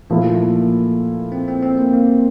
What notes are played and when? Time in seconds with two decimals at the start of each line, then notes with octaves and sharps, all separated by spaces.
0.10 A#2 F3 A3 A#3 E4 A4
1.32 C4
1.48 C4
1.63 C4
1.78 A#3
1.93 A#3